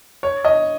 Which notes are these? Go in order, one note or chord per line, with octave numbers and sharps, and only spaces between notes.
C#5
D#5